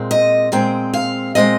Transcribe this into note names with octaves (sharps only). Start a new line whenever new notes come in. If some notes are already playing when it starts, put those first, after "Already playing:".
Already playing: A#2 G#3 C4
D#5
A#2 G#3 C4 G5
F5
A#2 F3 G#3 C4 D#5